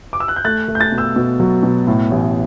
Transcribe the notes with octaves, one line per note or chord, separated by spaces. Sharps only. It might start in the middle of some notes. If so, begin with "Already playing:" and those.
D6
E6
F#6
G6
A3 F#6 A6
A3
G6
F#6 A6
B2
E6 G6
B2
F#3
B2
A2
A1